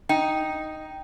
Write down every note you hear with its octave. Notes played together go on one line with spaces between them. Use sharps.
D#4 G5